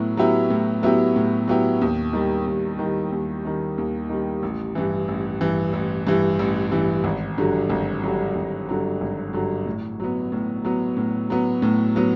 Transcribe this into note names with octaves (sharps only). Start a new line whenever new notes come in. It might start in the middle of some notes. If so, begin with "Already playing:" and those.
Already playing: A2 F#3 B3 E4
F#3 B3 E4 G4
A2
F#3 B3 E4 G4
A2
F#3 B3 E4 G4
D#2
D#3 G3
D#2
D#3 G3
D#2
D#3 G3
D#2
D#3 G3
A1
G2 E3
A1
G2 E3
A1
G2 E3
A1
G2 E3
G#1
G2 D3 F#3
G#1
G2 D3 F#3
G#1
G2 D3 F#3
G#1
G2 D3 F#3
A2
F#3 B3
A2
F#3 B3
A2
F#3 B3
A2
F#3 B3